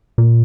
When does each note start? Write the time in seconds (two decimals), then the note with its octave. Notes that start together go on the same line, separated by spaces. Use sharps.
0.18 A#2